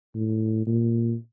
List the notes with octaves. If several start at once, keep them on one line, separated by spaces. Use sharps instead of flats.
A2
A#2